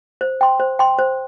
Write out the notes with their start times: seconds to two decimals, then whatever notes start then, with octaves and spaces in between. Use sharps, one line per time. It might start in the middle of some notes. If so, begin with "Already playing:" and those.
0.21 C5
0.41 G5 C6
0.60 C5
0.79 G5 C6
0.99 C5